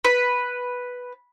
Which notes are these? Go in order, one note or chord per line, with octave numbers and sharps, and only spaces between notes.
B4